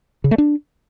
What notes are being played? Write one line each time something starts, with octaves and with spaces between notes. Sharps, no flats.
C#3
A3
D4